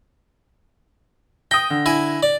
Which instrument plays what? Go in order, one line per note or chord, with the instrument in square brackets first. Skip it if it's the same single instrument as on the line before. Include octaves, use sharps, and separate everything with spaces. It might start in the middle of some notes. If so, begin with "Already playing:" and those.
[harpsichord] G5 [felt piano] D#6 A#6
[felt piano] D3
[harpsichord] E4 G#5
D5